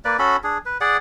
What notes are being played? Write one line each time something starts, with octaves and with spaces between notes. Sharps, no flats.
A#3 B4 D5
C#4 F#4 A4 B5
D4 G#4
B4
G#4 D5 F#5